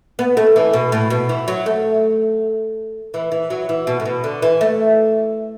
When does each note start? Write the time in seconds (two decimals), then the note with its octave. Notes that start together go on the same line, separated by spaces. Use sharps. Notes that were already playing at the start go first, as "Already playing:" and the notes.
0.19 B3
0.37 A3
0.56 E3
0.73 B2
0.92 A2
1.10 B2
1.29 E3
1.48 F#3
1.66 A3
3.14 E3
3.32 E3
3.50 F#3
3.69 E3
3.87 B2
4.00 A2
4.05 B2
4.24 D3
4.42 E3
4.61 A3